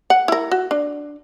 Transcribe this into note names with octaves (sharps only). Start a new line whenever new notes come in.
F#5
E4 A#4
F#4
D4